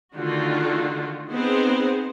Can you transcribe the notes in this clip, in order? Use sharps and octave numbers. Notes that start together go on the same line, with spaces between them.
D3 D#3 A3 F4 F#4
B3 C4 D#4 G#4 C5